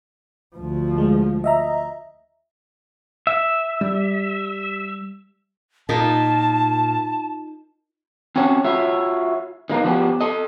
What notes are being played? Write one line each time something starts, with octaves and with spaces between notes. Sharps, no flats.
D2 F3
G#3
D#5 E5 A#5
E5
G3
A#2 D#4 F4 A#4 A5
C4 C#4 F#4 C#5 F#5 A5
F4 F#4 C#5 E5
D#3 G#3 A#3 B3 D#4
F3 B3 D4 F#4 G4
A4 D#5